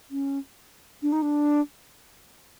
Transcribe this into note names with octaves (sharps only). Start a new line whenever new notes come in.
C#4
D4
D#4
D4